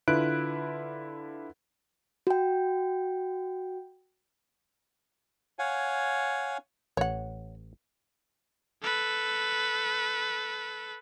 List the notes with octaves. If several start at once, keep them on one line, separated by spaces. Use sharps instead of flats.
D3 E4 F4 B4 F#6 D7
F#4 G5
C#5 F5 F#5 G#5
A1 C#5 F#5
A4 B4